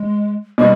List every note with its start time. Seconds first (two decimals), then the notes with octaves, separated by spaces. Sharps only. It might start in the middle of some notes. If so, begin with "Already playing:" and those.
Already playing: G#3
0.58 B2 G3